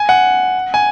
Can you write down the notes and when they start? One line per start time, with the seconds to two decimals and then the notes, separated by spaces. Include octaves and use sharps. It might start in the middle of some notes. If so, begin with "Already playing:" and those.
Already playing: G#5
0.09 F#5
0.74 G#5